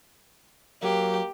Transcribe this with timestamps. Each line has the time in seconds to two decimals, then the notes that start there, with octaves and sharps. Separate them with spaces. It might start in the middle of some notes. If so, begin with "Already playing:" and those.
0.83 F#3 A#3 G4